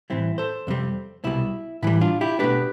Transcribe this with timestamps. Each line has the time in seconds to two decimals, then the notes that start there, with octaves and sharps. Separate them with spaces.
0.10 A2 E3 G3 C4 E4
0.38 A4 C5
0.67 F2 C3 G3 C4
1.24 C2 B2 G3 E4
1.82 A2 E3 G3 E4
2.01 D4 F4
2.21 E4 G4
2.39 B2 A3 D4 G4 B4